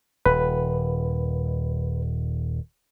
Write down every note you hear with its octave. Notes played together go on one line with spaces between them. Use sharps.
D#1 B4